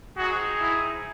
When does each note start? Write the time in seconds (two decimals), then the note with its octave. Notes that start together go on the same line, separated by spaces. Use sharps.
0.17 C4 D#4 F#4 G#4
0.61 E4